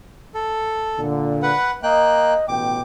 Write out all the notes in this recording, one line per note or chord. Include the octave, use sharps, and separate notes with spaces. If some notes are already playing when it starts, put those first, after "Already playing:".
A4
A#2 D3
B4 F#5
A#3 D#5 G5 F#6
A1 B2 G5 D6